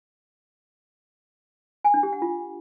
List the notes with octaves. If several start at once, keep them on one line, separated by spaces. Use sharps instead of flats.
G#5
D4
G4
F#5
F4